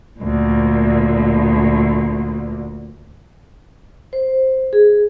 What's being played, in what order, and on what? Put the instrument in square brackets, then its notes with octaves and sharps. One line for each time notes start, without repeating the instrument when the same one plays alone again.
[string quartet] D2 A#2
[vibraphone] C5
G#4